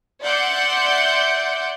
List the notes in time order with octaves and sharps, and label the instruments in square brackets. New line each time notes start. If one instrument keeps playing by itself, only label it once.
[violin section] D5 E5 F#5 C6 G6